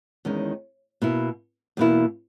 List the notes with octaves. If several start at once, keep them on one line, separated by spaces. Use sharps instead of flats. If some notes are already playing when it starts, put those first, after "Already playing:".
E2 D#3 G#3 C#4
B2 A#3 E4
E2 B2 A#3 E4